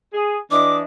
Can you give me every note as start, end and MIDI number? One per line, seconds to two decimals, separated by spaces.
0.14 0.37 68
0.51 0.83 52
0.51 0.83 62
0.51 0.83 75
0.51 0.76 86